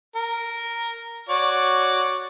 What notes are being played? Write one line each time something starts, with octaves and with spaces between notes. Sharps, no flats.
A#4
F#4 C#5 D5